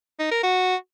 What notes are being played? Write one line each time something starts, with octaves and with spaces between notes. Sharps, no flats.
D#4
A#4
F#4